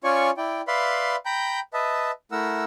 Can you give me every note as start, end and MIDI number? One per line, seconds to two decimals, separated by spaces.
0.04 0.31 61
0.04 0.31 65
0.04 0.31 73
0.04 0.31 74
0.04 0.31 80
0.04 0.31 85
0.37 0.61 64
0.37 0.61 74
0.37 0.61 79
0.68 1.16 71
0.68 1.16 74
0.68 1.16 76
0.68 1.16 77
0.68 1.16 83
0.68 1.16 84
1.26 1.60 79
1.26 1.60 82
1.26 1.60 83
1.26 1.60 91
1.74 2.11 71
1.74 2.11 75
1.74 2.11 76
1.74 2.11 81
2.32 2.65 57
2.32 2.65 64
2.32 2.65 70
2.32 2.65 78
2.32 2.65 88